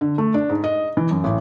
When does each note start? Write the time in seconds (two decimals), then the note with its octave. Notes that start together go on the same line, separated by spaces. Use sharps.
0.01 D3
0.18 A3
0.34 D4
0.49 G#2
0.64 D#5
0.97 E3
1.11 F#2
1.24 A1